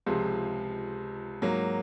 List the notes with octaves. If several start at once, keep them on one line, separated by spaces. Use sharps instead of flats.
C#2 C3 F3 G#3
G#2 F#3 A#3